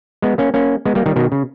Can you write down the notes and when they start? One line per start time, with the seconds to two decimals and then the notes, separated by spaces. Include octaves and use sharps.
0.22 G#3 B3
0.38 A#3 C#4
0.54 A#3 C#4
0.85 G#3 B3
0.95 G3 A#3
1.06 D#3 G3
1.16 B2 D#3
1.32 C#3